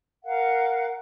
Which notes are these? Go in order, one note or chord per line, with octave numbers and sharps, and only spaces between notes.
A#4 F5 F#5